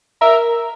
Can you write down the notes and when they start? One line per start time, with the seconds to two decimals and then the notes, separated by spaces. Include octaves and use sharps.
0.21 A#4 E5